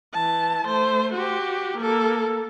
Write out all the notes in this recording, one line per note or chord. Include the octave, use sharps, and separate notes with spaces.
E3 A5
A3 C5
F#4 G4
A#3 A4